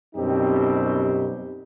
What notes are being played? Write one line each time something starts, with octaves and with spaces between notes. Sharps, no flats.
F#2 B2 G3 C4 D#4 G4